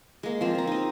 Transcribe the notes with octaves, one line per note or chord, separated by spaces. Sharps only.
G#3 A#3
F3 A#3 C4
F3 A#5
D#4 D#5